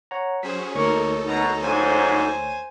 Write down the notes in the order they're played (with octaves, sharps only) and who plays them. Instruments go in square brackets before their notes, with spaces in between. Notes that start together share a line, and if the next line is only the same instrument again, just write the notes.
[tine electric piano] C#5 F#5 A#5
[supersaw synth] F#3 C#4 G#4 [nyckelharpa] C5 [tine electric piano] B6
[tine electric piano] D2 C#5 C#6 [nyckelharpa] A#3 A#4 [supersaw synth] D#4 A4
[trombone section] B2 [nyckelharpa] A#5
[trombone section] A#1 G#2 F#3 [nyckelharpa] C5 G#5